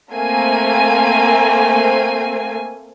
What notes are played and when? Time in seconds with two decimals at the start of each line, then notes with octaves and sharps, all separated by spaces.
0.12 A3 A#3 C4 G#5